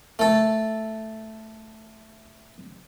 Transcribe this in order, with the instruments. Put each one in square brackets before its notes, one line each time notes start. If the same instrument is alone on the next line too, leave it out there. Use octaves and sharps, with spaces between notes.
[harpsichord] A3 A4